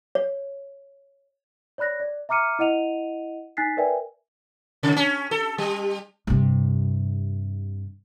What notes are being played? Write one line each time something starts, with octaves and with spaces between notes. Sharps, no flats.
C#5
C#5 D5 B5 F#6 A#6
D5
E5 A#5 D6 F6 C#7 D#7
E4 D#5 F#5 D#7 F7
D#4 G#5 F#6 A6 B6 C7
A#4 B4 D5 E5 G5 G#5
C3
C#4
A4
G3
G2 C3